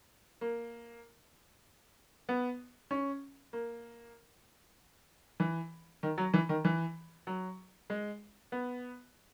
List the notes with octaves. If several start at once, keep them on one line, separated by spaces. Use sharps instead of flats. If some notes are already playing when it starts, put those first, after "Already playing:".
A#3
B3
C#4
A#3
E3
D#3
F#3
E3
D#3
E3
F#3
G#3
B3